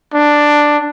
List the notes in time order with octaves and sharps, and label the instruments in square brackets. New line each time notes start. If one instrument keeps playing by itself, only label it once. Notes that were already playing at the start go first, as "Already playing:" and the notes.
[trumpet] D4